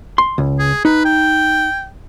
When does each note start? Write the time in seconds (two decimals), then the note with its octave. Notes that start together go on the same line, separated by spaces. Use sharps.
0.18 C6
0.38 C#2
0.59 G#4
0.85 D#4 B4
1.05 G5